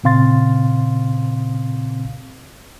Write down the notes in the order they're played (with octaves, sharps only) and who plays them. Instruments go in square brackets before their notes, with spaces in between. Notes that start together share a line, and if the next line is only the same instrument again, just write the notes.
[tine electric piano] A#2 C#3 C4 F5 C6 A6